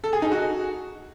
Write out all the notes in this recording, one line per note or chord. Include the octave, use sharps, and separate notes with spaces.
A4
G#4
D#4
F#4